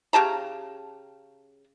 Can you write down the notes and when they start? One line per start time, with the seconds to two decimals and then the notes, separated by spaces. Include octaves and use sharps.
0.13 C#3 G4 A5 A#5